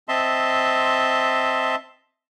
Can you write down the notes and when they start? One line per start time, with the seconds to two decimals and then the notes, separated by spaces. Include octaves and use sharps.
0.08 C4 D#5 E5 A5 C6